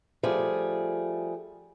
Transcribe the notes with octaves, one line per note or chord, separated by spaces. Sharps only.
F3 G3 A3 G#4